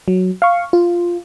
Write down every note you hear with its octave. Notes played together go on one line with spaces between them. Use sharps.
F#3
F5 C#6
F4